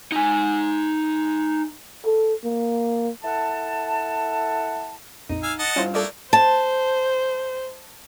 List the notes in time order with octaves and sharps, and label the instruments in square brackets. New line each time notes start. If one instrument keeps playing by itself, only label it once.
[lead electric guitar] D#4 G#5
[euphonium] A4
A#3
[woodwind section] E4 A4 F#5 A5
[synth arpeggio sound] A#1 F2 [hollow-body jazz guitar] D#4
[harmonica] F5 G#5 E6
D#5 F#5 A5
[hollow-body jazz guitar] G2 F4 [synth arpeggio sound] C#4 E4 C5
[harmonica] A3 A#3 [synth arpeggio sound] A4 D5 D#6
[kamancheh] C5 [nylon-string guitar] A5